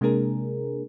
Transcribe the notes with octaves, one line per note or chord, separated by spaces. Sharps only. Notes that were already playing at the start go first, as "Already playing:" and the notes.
C3 G#3 A#3 D4 G#4 A#4